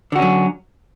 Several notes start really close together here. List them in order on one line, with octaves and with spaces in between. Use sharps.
D3 F#4 C#4 F#3